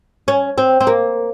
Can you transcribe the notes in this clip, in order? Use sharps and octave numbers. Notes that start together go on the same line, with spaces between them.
C#4
C4
C4
A#3